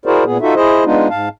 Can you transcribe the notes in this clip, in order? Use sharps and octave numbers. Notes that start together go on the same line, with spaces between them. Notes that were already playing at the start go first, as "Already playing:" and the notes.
E4 F#4 G#4 A#4 C5 D5
A#2 B3 G#4
D#4 F4 F#4 A4 E5
E4 G#4 C5 D#5
G#3 B3 D4 D#4 F4
G#2 F5 A5